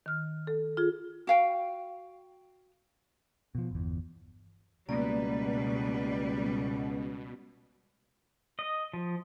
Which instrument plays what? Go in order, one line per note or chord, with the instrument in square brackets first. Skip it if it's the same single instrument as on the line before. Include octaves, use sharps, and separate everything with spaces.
[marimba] D#3 F6
A4
F4 G#4
[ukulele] F#4 F5 G5
[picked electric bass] B2 F3
G1 E2
[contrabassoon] C#2 [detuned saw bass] B2 [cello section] G3 B4 [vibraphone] A#3 D5
[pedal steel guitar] D#5
F3